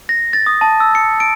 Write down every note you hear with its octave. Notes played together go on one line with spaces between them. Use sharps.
A#6
A6
D#6
A5
E6
C#7
D7